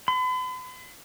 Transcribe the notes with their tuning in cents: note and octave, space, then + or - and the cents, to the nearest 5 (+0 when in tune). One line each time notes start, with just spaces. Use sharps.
B5 +45